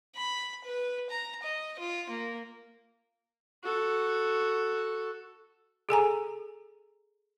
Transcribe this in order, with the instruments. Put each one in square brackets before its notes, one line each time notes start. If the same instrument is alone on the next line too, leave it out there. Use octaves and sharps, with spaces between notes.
[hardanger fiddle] B5
B4
A#5
D#5
F4
A#3
[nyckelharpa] F#4 A4
[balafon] G#4 A4 G#5 A#5